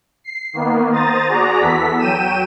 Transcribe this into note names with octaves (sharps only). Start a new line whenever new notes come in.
C7
D#3 A#3 B3
C5 A#5 D#6 A6
F#4 G#4 D5 A#5
E2 B3 A4 B6
F#3 G5 D#7 E7